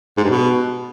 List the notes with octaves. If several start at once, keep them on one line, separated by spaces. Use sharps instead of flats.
G#2
G2
B2